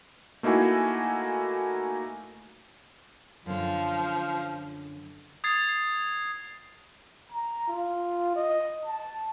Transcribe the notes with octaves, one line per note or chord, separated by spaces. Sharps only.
A3 A#3 D#4 E4 F#4 G#5
F#2 D3 F3
D#6 G#6 A6 C7
A#5
F4
D#5
A5